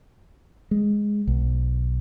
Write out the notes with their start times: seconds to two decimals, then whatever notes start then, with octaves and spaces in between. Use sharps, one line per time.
0.71 G#3
1.27 B1